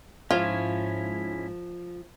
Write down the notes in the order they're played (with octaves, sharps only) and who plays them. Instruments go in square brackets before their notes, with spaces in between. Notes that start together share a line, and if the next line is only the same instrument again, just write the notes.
[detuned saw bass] G#2 [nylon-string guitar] F3 [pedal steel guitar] C#4 E4 C#5 [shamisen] F4